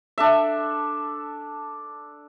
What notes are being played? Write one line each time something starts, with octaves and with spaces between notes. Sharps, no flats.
D4 A4 E5